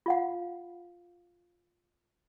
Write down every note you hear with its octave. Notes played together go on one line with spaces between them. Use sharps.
F4 F5 F#5